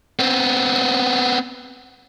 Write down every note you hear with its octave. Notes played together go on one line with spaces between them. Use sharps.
B3 C4